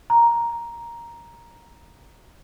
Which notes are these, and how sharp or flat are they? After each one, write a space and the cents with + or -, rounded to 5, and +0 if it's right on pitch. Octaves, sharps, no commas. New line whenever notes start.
A#5 +5